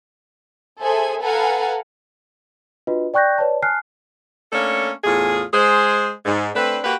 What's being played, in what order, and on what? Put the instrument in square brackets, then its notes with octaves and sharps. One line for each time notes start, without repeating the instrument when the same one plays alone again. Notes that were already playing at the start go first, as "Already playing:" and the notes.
[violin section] G#4 A4 C5 E5 G#5
A4 B4 F5 F#5 G#5 A#5
[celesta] D4 F4 F#4 B4 D#5
D5 G5 C#6 F#6 G6 A#6
B4 C#5 D5 A5
G#5 A5 F6 F#6 C7
[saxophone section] A3 A#3 C#4 D4 A4 C#5
E2 A2 F4 G#4
G#3 G#4 C5
G#2
A3 C4 D4 B4
A#3 F#4 G4 B4